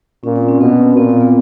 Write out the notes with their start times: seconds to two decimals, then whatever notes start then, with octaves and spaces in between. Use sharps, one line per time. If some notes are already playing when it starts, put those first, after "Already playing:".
0.24 A#2 C#4
0.36 C4
0.48 C#4
0.60 B2 B3
0.91 C4
0.96 A#2 B3
1.09 C4
1.21 A#3